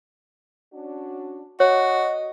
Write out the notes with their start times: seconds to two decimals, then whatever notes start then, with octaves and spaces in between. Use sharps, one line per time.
0.73 C#4 D4 F#4
1.60 F#4 C#5 D#5